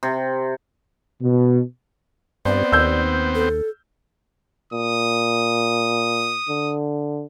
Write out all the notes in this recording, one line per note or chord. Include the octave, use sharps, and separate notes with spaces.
C3
B2
G2 B3 C4 C5 D5
D#2 E6 G6
A4
A#2 D#6
D3